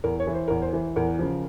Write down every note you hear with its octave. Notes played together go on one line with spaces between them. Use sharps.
E2 A#4
C#5
E3
C5
E2 A#4
C5
E3
E2 A#4
C#3 F3